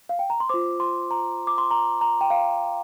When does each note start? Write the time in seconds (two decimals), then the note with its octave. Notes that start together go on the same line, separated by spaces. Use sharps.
0.09 F5
0.19 G5
0.30 A#5
0.40 C6
0.49 F4 C5 D6
0.80 C6
1.11 A#5
1.47 D6
1.58 C6
1.71 A#5
2.01 A#5
2.21 G5
2.30 F5